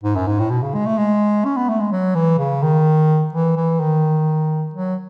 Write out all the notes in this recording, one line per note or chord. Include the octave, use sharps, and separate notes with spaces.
G#2
F#2
G#2
A2
B2
C#3
G#3
A3
G#3
C#4
B3
A3
G#3
F#3
E3
C#3
D#3
E3
E3
D#3
F#3